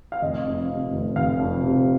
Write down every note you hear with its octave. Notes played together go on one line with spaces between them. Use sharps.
F5
F1 D#5
F2
C3
F1
F1 F5
F2
C3